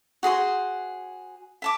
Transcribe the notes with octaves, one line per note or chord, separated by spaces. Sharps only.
F#4 G#4 B4 C5
E5 A5 D6